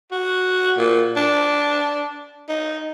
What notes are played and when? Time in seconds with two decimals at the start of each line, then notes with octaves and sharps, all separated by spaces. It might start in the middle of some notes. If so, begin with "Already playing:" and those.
0.12 F#4
0.78 A#2
1.17 D4
2.49 D#4